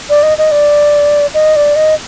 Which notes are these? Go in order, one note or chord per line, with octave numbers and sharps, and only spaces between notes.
D5
D#5
D#5
D5
D#5
D5
D#5